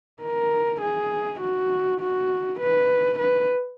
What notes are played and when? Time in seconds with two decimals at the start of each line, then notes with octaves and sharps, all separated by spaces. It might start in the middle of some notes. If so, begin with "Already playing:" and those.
0.22 A#4
0.82 G#4
1.40 F#4
2.01 F#4
2.59 B4
3.19 B4